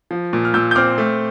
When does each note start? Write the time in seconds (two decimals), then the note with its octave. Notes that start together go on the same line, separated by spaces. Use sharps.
0.11 F3
0.33 A#2
0.45 F6
0.54 A#2 E6 G6
0.71 G6
0.75 C4 D6 F6
0.98 A3